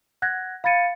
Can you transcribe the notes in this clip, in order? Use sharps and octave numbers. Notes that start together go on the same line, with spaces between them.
F#5 F#6 G#6 A#6
F5 B5 G#6 A6 C#7 D#7